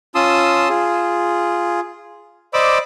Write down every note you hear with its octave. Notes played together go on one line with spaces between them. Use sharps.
C#4 F4 A5 C6 D#6 E6
F4 G#4
C5 D5 D#5 B5 D6 E6